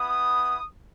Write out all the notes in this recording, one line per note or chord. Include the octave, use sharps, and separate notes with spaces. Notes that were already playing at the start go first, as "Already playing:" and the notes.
Already playing: B3 E4 D#6